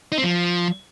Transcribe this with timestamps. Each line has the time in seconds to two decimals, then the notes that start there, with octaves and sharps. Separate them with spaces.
0.12 D#4
0.18 C4
0.24 F3